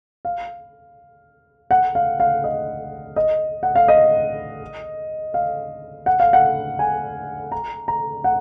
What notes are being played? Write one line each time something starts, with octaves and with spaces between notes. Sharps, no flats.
F5
F#5
F5
F5
D#5
D#5
F#5
F5
D#5
F5
F#5
F5
F#5
G#5
A#5
A#5
F#5